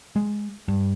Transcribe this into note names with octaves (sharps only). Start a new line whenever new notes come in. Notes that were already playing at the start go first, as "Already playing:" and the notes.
G#3
G2